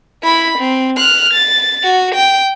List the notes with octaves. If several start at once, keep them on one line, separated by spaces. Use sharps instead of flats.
E4 B5
C4
F6 F#6
A6
F#4
G5